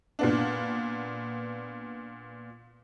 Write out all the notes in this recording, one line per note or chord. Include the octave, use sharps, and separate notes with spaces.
A#2 B3 D4